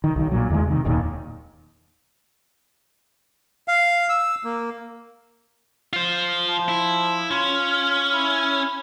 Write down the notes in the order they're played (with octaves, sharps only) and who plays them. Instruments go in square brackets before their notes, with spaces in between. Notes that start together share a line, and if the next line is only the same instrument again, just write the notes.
[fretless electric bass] D#3
B1 D#3
A#2 F#3
E2 D#3 E3 G#3
C3 D#3
D1 D#2 A#2 D#3
[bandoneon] F5
E6
A#3
[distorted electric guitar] F4 C5
[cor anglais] F3
[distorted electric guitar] E4
[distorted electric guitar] C#4 [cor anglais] F4
[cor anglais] E4